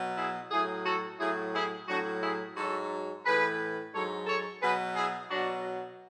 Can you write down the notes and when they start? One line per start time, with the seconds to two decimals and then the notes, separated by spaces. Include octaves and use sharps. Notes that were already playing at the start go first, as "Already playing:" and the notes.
Already playing: B2 F#3
0.18 E4 G#4
0.51 A2 F#3 E4 G#4
0.86 F#4 A4
1.20 A2 F#3 E4 G#4
1.55 E4 G#4
1.88 A2 F#3 D4 F#4
2.22 E4 G#4
2.56 G#2 F#3 F#4 A4
3.25 A2 E3 G#4 B4
3.93 G#2 F#3 A4 C#5
4.27 A4 C#5
4.62 B2 F#3 G#4 B4
4.96 E4 G#4
5.30 B2 F#3 D4 F#4